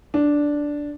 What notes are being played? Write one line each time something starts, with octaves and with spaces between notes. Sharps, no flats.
D4